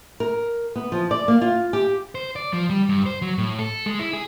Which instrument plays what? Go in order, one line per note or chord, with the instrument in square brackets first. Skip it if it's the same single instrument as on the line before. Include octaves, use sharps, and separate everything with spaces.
[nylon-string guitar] A#4
B3
F3
D5
A#3
F4
G4
[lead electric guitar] C5
D5
F3
G3
G2
C5
F#3
A2
A4
G#3
E4
G#4